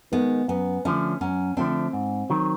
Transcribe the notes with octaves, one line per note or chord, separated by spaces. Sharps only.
D#3 G#3 B3
F#2 B3
D3 F3 A3 C#4 D4
F#2 C#4
D3 F3 A3 C4 D4
G#2
D#3 F#3